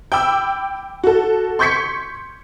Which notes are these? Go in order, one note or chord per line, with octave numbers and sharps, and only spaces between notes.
G5 B5 D6 E6
F#4 A4
C6 C#6 G6 G#6 B6 C#7